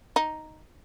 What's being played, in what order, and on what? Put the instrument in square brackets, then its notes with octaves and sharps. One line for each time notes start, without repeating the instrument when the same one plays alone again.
[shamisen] D#4